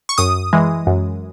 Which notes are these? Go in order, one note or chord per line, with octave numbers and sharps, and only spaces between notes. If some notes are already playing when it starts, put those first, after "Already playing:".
C#6
F#2 D#6
E3 G#3
F#2